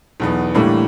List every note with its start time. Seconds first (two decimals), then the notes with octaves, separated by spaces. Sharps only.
0.20 B1 E2 B3
0.54 A2 D3 E3 G3 A3 A#3